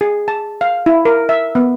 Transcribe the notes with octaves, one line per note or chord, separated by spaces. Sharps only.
G#4
A5
F5
E4
A#4
E5
B3